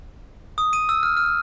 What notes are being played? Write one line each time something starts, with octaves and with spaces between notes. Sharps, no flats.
D#6
D#7
E6
F6
F6